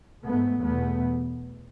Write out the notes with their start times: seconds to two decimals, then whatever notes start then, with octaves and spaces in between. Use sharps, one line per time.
0.25 G#2 A3 B3
0.64 E2 B2 A3 B3